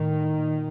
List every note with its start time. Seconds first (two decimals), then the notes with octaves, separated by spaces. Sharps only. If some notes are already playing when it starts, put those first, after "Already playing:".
Already playing: A2 D#3
0.38 A#2